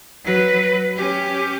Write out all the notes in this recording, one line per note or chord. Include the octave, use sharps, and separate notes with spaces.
F#3 B4
C#4 G4